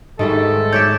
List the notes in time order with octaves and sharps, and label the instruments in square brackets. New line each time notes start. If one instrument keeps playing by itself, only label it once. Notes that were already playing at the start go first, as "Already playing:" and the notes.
[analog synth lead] G#2 [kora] D#3 G3 A3 [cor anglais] A4
[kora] C#5 D5 E5 [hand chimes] G6